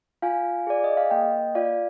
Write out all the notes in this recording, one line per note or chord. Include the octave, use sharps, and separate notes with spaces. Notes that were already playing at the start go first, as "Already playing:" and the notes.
F4 F5 G#5
G#4 D5
D#5
F5
A#3 D#5 G5
F4 D5 F5